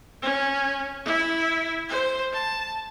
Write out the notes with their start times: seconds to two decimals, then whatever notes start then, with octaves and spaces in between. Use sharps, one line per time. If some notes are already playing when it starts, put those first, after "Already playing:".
0.22 C#4
1.05 E4
1.89 C5
2.33 A5